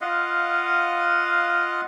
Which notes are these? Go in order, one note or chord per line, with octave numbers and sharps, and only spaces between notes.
F4 D#5 F5 F#5